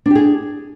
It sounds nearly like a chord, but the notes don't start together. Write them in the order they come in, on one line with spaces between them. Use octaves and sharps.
D4 G4 G#4